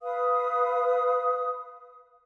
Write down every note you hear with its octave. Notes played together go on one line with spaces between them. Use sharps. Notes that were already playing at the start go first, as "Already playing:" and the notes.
B4 F5 D#6